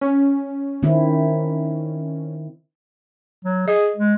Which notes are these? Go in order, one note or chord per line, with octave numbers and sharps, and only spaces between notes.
C#4
D#3 C4 E4
F#3
G#4 D#5
G#3